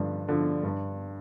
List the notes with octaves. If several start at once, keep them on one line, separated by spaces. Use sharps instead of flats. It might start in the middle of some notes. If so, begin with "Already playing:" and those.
Already playing: G2 D3 F3
D3 F3
G2